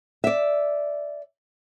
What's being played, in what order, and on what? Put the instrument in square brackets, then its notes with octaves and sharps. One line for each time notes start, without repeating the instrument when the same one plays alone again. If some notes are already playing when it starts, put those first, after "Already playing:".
[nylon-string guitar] D5 E5